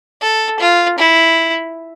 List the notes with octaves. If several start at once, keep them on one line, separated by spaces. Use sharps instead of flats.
A4
F4
E4